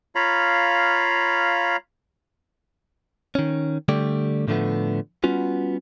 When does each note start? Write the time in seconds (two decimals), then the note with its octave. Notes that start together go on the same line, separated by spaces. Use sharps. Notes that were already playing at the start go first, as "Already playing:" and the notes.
0.15 F4 C#5 F5 A#5 B5
3.35 D#3 C#4
3.88 D3 G3 A3 G4 D5
4.48 A2 D3 F3 A3 B3
5.24 G3 B3 C#4 F4 F#4